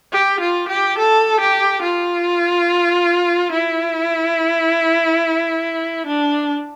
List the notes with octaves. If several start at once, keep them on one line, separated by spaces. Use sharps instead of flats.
G4
F4
G4
A4
G4
F4
E4
D4